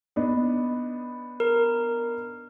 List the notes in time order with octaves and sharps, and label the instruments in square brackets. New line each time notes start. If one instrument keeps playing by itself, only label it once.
[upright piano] B3 D4 D#4
[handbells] A#4